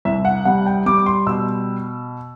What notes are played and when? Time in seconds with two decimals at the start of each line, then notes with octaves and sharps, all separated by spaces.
0.05 C2 E5
0.25 F#5
0.45 G3 F#5
0.66 G5
0.86 G3 D6
1.06 C6
1.27 B2 E6